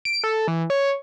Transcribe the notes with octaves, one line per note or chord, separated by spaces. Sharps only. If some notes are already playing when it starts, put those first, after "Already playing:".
D7
A4
E3
C#5